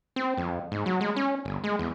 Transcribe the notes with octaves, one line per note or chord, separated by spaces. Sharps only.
C4
F2
G#2
F#3
G#3
C#4
G1
G#3
E2